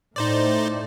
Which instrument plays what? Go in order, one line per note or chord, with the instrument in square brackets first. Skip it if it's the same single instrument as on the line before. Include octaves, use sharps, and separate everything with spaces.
[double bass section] A2 [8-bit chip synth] D#4 C5 D5